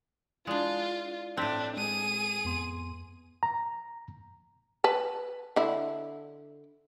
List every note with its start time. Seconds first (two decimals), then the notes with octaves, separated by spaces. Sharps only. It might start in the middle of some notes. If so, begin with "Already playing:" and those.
0.47 G#3 D4 E4 F4 D5
1.37 A2 C4 D4 F#6 B6
1.77 G#3 G#4 D#7
2.45 F2 B3 C6
3.43 A#5
4.84 B4 A5
5.56 D3 E4